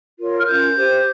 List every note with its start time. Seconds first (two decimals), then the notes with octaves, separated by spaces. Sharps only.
0.18 F4 A#4 C#5
0.38 F6
0.46 C#4 F4 A#4 G6
0.75 G4 C5